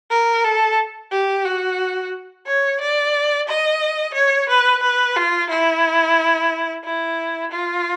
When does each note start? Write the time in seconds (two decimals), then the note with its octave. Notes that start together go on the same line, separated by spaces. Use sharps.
0.11 A#4
0.44 A4
1.11 G4
1.45 F#4
2.46 C#5
2.80 D5
3.48 D#5
4.14 C#5
4.49 B4
4.83 B4
5.16 F4
5.50 E4
6.84 E4
7.51 F4